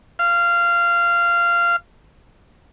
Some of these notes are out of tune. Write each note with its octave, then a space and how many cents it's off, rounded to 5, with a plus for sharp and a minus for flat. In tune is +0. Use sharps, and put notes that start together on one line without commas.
F5 -15